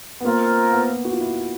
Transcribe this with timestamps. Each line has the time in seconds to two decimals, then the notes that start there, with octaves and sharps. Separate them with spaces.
0.20 B3
0.24 A#3 C4 F4 A#4
0.72 B3
1.05 F#4
1.12 F4
1.20 E4